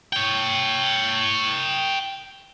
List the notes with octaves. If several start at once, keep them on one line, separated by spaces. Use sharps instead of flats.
C#5 G5